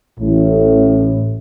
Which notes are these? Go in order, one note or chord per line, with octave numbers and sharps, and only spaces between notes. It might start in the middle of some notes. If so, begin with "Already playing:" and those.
A1 A2